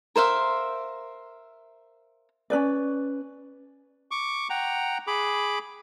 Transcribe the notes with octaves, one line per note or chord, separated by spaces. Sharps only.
A#4 C5 E5 F5
C#4 D4 B4 D5
C#6 D6
F#5 G5 A#5
G#4 B5 D6